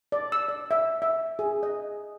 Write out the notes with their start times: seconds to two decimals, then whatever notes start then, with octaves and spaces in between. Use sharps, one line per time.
0.12 D5
0.32 E6
0.48 D5
0.71 E5
1.02 E5
1.39 G#4
1.63 D#5